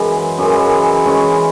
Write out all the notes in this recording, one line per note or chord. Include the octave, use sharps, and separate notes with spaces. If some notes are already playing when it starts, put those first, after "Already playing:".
Already playing: F#2 C#3 E3 G#3
F#2 C#3 E3 G#3
E3 G#3 C#4